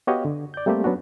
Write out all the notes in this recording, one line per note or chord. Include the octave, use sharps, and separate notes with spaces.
B3 F#4 G4 C#5 D#5 F5
D3
D5 G6
G3 A3 A#3 C4 G4
F#3 B3 C#4 D4 F#4